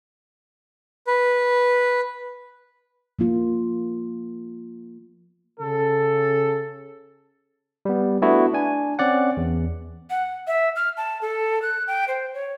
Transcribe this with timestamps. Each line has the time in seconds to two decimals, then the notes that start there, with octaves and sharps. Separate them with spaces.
1.07 B4
3.19 F3 A#3 F4
5.60 C#3 A4
7.85 G3 B3
8.22 A3 B3 D4 E4 F#4
8.53 D4 G#5
8.99 C4 C#4 D5 F#5
9.37 E2
10.10 F#5
10.47 E5
10.76 F6
10.97 A5
11.21 A4
11.62 F#6
11.87 G5
12.08 C5
12.34 C#5